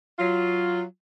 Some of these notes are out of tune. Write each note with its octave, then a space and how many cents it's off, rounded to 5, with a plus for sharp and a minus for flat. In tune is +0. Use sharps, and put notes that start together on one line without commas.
F#3 +0 F4 +0